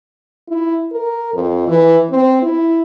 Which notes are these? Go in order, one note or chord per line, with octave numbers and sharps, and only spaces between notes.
E4
A#4
F2
E3
C4
E4